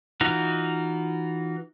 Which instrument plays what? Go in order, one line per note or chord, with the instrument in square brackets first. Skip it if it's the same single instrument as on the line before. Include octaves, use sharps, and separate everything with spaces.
[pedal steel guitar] E3 D#4 F4 F#4